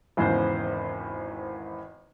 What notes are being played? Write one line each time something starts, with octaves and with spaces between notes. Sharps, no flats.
G#1 E2 G#2 C#3 C5